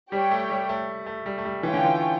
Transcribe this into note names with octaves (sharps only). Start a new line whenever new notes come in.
G3 G4 C#5 G5
A3
G3
A3
A3
G3
A3
G3
E3 C#4 F4 C#5 G5
D3
E3